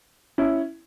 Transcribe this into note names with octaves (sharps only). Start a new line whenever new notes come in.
C#4 E4